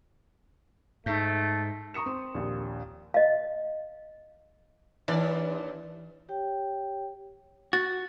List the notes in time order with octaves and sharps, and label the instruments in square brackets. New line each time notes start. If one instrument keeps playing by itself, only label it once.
[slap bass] G#2 [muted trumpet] A3 [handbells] D#4 G6
[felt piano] A#5 C#6 D#6 C#7 E7
C4
A#1 D#2
[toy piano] D#5 F5
[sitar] D#2 D4 D5 [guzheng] E3
[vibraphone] G4 C#5 G5
[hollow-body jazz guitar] F#4 [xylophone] A6